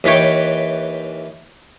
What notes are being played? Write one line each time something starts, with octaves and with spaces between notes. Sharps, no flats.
D#2 E3 B4 C#5 G5